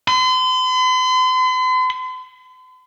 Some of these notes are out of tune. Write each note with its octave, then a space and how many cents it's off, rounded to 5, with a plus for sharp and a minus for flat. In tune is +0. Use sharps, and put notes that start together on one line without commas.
C6 -45